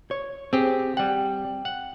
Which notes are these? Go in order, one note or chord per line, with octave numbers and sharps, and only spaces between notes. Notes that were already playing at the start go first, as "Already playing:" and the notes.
C#5
C4 G4 G#4
G3 F#5 G5
F#5